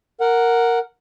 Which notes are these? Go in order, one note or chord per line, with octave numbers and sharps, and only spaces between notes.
A#4 F#5